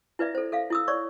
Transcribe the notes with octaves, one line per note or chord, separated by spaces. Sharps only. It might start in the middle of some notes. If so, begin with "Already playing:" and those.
E4 B4 D5 E5
A4 C5
A4 E5 F5
E4 D#6 E6
C#5 D5 C#6